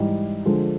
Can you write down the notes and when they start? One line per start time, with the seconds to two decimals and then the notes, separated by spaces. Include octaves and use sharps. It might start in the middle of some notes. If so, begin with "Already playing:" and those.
Already playing: G#2 E3 G3
0.46 D3 F3 G#3